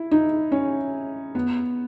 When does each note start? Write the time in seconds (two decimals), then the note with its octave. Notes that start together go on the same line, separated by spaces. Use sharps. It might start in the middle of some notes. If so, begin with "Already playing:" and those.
Already playing: E4
0.11 D#4
0.52 C#4
1.35 B3